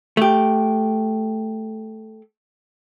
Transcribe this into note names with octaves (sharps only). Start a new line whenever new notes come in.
A3 G4